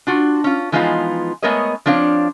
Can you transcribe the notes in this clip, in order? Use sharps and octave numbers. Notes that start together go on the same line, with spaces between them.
D4 F4 F#4
C#4 F4
E3 F3 G#3 B3 D#4 F4
G#3 A3 B3 A#4 C#5 D#5
F3 C4 D4 C#5 F5